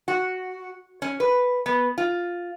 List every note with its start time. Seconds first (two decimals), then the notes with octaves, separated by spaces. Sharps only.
0.08 F#4
1.02 C#4
1.20 B4
1.66 B3
1.98 F4